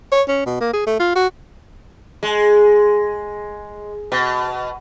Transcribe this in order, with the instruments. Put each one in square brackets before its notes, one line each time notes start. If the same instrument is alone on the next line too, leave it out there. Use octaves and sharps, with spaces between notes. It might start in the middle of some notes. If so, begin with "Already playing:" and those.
[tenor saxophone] C#5
C#4
B2
A#3
G#4
A3
F4
F#4
[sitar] G#3
B2